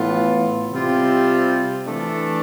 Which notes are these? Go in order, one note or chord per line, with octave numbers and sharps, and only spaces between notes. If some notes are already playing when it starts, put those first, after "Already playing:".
Already playing: A2 E3 B3 F4
C3 G3 C4 F4
E3 A3 D4